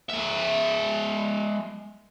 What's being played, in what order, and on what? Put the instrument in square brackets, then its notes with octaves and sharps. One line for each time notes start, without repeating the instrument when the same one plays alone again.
[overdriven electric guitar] G#3 E5